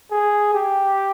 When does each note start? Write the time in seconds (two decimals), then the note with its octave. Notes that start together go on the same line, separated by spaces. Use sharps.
0.12 G#4
0.54 G4